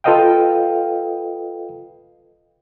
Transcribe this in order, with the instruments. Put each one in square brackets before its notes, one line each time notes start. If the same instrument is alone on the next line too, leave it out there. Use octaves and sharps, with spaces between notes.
[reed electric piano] F4 A4 B4 D#5 F5 G5